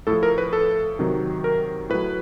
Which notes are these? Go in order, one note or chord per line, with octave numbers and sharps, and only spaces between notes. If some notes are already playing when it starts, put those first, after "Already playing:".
A2 F3 A4
A#4
B4
A4
C3 D#3 F#3
A#4
A2 F#3 B4